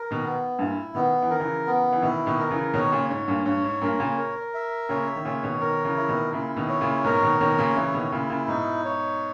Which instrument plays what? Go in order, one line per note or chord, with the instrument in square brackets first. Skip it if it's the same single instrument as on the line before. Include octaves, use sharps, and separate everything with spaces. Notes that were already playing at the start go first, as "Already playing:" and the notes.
Already playing: [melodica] A#4
[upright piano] B2 D#3
[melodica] B3
[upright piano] G2 A#2 [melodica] E4
[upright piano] B2 D#3 [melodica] B3
[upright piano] E3
[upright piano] D#3 [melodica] A#4
[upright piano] C#3 E3
[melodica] B3
[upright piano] E3
[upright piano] B2 D#3 [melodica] E4
[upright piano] B2 D#3
[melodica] A#4
[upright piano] C#3 E3
[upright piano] B2 D#3 [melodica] C#5
[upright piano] A#2 C#3
[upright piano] G#2 [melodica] C#5
[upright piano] G2 A#2
[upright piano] G2 [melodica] C#5
[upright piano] G#2
[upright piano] G2 A#2 [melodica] A#4
[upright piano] A#2 C#3
[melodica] A#4
E5
[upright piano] A#2 C#3 [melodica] C#5
[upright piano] D#3
[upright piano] A#2 C#3 [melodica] C#5
[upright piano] B2 D#3
[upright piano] B2 D#3 [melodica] A#4
[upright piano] C#3 E3
[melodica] E4
[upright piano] B2 D#3
[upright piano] A#2 C#3 [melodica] E4
[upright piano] B2 D#3
[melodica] C#5
[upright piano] A#2 C#3
[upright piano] G#2 B2 [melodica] A#4
[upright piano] B2 D#3
[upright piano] B2 D#3 [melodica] C#5
[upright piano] A#2 C#3
[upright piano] C#3 E3 [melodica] E4
[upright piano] B2 D#3
[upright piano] A#2 C#3 [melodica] E4
[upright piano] A#2 C#3
[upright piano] G#2 B2 [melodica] D#4
[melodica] C#5